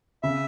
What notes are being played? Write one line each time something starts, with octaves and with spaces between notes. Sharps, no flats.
C#3 E5